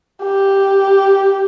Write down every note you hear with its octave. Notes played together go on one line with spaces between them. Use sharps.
G4